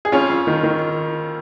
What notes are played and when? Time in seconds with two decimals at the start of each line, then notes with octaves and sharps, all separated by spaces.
0.05 G#4
0.12 F2 C#4 F4
0.30 F2
0.47 D#3
0.63 D#3